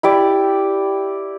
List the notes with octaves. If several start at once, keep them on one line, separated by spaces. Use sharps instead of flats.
E4 G4 D5